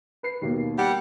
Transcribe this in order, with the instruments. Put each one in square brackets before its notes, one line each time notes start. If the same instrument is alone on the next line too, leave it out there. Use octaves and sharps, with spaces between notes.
[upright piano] B4 C7
D#2 B2 A#3
[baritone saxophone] G3 [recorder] F#5 [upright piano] G5